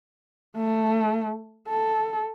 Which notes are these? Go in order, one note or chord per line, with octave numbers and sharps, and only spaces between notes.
A3
A4